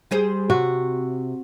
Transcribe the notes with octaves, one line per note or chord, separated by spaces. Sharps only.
G3 G#4 C5
C3 F#4